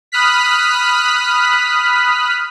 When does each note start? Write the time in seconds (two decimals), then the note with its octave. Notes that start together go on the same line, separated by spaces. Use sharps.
0.12 B5 D#6 F6 F#6 B6